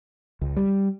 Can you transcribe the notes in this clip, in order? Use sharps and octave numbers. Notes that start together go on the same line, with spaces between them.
C#2
G3